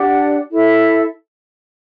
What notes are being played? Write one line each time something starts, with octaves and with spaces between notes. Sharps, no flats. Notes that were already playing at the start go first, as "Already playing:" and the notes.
Already playing: D4 G4 D5 F#5
E4 A4 E5